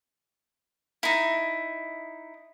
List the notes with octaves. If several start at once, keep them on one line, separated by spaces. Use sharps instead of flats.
D#4 E4